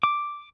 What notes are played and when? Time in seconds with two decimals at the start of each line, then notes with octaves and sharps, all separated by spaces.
0.03 D6